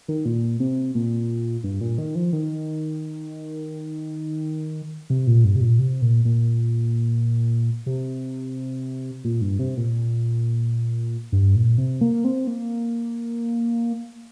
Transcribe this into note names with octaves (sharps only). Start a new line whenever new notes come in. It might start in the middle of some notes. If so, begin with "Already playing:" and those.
D#3
A#2
C3
A#2
G2
A#2
D#3
F3
D#3
C3
A#2
G2
C3
A#2
C3
A#2
A#2
C3
A#2
G2
C3
A#2
G2
A#2
C3
A#3
C4
A#3